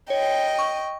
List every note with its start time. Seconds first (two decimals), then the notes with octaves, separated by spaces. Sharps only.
0.10 C#5 D#5 G5
0.59 C#6